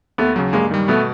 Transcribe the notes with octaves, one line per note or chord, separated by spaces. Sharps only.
D#2 A3 B3
C#3 F#3
G2 G#3 A#3
D#3 G3
B2 A3 B3